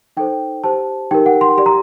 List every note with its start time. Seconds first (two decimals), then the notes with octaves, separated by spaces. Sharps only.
0.17 D#4 A4 C5 G5
0.64 G4 C5 A5
1.11 D#4 G4 A#4 G5
1.26 F#5
1.41 C6
1.57 G4 D5 C6
1.66 A#5